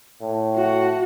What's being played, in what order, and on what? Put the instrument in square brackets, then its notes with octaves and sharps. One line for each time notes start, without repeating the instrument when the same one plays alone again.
[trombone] A2
[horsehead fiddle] F#4